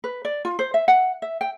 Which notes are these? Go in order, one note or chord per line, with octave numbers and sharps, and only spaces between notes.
B4
D5
F4
C5
E5
F#5
E5
G5